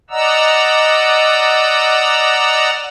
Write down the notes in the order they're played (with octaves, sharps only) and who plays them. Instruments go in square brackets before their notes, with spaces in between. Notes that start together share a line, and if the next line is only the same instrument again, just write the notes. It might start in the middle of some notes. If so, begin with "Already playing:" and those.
[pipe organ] D5 D#5 F#5 A#5 E6